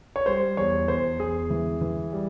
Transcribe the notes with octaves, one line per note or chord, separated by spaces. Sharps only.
C#5
G3 C5
E2 C#5
E2 C5
E2 G#4
E3
E3
G3